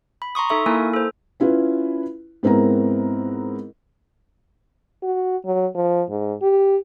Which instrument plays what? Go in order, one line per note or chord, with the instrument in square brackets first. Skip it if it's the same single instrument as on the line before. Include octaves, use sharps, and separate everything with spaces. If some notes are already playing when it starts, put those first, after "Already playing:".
[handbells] B5
A#5 C6 C#6 D#6
D#4 A4 E5 C#6
A#3 E4 A#4 G#5
A4 C5
[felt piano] C#4 E4 F4 B4
G#2 B3 C4 E4 A#4 A#5
[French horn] F#4
F#3
F3
G#2
G4